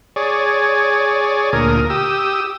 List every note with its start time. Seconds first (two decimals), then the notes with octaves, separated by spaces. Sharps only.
0.16 G#4 C#5 D5
1.53 D2 A#2 A#4 D#6
1.90 G4 D#6 E6